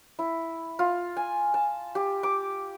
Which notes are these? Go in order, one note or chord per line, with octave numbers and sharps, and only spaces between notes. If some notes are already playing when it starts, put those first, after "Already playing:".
E4
F4
G#5
A5
G4
D6